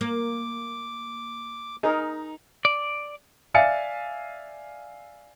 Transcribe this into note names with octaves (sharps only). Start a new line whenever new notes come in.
A#3 D6
D#4 G#4 A#4
D5
D5 E5 F5 G#5 A6 C#7